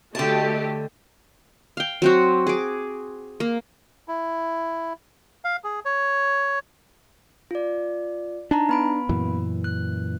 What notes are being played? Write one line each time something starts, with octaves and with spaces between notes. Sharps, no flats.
D3 A3 F#4 G4 A4 D#5 A5
F5 G5
F#3 C4 F#4
G#4 D6
A#3
E4
F5
G#4
C#5
F4 D5
D4 D#4 A5 A#5
B3 B5 D7
F#2 A#2 E3
F#6